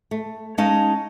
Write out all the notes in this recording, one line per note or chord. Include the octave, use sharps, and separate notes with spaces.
A3
G#3 C#4 D#4 F5 A5